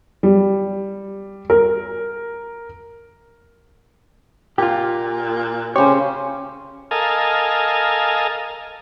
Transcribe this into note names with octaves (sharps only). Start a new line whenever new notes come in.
G3
A#4
A#2 F4 G4
C#3 C#4 G4 C5 C#5
A4 A#4 D#5 F5 G#5